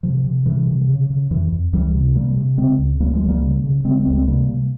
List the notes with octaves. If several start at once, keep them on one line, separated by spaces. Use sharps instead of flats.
C3 F3
C3
C3 E3 G3
C3
C#3
C#3
F2 E3
F2
C#2 E3 G3
C3
C3 G3 A#3
C3
C#3 G#3 C4
C#2
C#2 G3 A#3
F3 G#3
C#2
G3 A#3
C#3
C#3
C#3 G#3 C4
G#3 C4
C#2
G#3 C4
C3 G3 A#3
C3